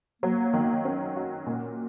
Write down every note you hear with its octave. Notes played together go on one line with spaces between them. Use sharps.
F#3 A#3
D#3
C#4
F#4
A#2